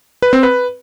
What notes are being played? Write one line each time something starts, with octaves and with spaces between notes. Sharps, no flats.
B4
C4
B4